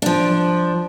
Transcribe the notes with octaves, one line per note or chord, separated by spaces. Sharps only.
F3 D4